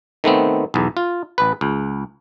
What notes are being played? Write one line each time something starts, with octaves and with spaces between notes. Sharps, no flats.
D#3 A3 B3 C4
B1 E2
F4
A1 B4
C#2